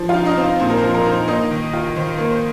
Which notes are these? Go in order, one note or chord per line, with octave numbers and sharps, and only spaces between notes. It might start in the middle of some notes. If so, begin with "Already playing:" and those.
Already playing: F3
F4 F5
D#4
D#4 D#5
C4
C5
A#2 C5
A#4
C5
F3
A#4
D#4
C5
A#3 D#4 D#5
D#3
F4
D#3 C5
A#3
C5